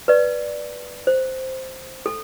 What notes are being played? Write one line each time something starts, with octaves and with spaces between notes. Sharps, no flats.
B4 D5
C5
A4